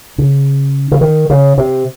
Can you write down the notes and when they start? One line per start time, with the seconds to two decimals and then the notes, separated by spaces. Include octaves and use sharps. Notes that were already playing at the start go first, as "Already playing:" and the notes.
0.18 C#3
0.91 C#3
1.01 D#3
1.30 C#3
1.58 C3